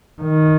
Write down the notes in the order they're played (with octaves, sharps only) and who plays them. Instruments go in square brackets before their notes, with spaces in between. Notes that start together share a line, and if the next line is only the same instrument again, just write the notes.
[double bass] D#3